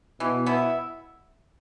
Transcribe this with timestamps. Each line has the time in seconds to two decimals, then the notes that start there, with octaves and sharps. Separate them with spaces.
0.20 B2 E3
0.46 B3 E4